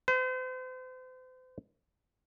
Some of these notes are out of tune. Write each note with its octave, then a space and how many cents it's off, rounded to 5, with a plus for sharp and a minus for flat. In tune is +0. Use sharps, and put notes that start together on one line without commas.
C5 -40